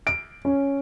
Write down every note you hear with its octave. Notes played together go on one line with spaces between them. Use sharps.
D7
C#4